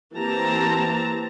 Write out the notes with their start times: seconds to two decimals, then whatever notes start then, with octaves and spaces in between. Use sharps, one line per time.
0.15 E3 A#3 C4 G4 A5 A#5